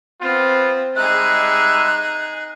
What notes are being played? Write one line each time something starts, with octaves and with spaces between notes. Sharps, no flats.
B3 C4 F4
G3 G#3 D#4 G#4 E5 F#6